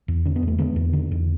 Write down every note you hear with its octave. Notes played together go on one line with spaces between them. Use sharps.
E2
D3 C#4
B3
E2 A3
D3 G#3 B3
E2
D3
E2